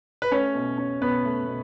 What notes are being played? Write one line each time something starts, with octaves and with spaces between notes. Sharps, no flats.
B4
A3 C#4 C#5
B2
C#4
B2 B3 B4
A3
B2